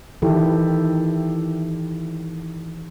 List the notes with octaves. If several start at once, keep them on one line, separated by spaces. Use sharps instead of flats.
D#3 E3 E4 G4 A4